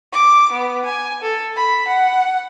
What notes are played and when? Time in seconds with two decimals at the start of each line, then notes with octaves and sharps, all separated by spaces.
0.13 D6
0.52 B3
0.85 G#5
1.22 A4
1.56 B5
1.88 F#5